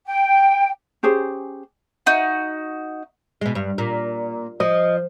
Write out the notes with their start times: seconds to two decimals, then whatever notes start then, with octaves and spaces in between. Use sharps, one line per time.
0.07 G5
1.03 C#4 G4 G#4 C5
2.06 D#4 F#4
3.41 B2 G#3
3.55 G2
3.78 A#2
4.60 F3 D#5